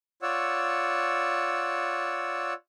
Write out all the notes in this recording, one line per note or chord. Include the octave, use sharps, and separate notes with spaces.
F4 C#5 D5 F#5 E6